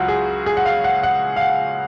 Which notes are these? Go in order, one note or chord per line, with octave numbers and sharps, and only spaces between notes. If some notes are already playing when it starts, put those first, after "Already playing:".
Already playing: C#2 C#3 F#3 C#4 F4 F#4
G#4
G#4
F#5
F5
F#5
F#5
F5
F#5